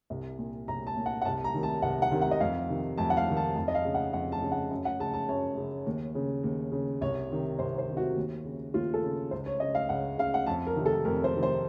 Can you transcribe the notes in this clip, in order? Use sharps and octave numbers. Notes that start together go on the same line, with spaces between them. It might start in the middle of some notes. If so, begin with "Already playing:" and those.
C2
A#2
C2 A#5
A5
A#2
F#5
F#5
C2 A5
A#5
C3 D#3
A5
C2 F#5
F#5
C3 D#3
F#5
D#5
F2 F5
C3 D#3
F2 A5
F#5
F5
C3 D#3
A5
F2 A5
D#5
F5
C#3
F#5
F2 F#5
A5
C#3
F#5
F#2
F#5
C#3 A5
A5
F#2 C#5
C#3
D#2
C#3
D#2
C#3
C2 C#5
C3 D#3
C2 C5
C5
C3 D#3
F#4
D#2
C#3
D#2 F4
A4
C#3
C#2 C5
C#5
C#3 D#5
F5
C#2 F#5
C#3 F5
F#5
F2 A5
A#4
C3 D#3
A4
F2 A#4
C5
C3 D#3
C5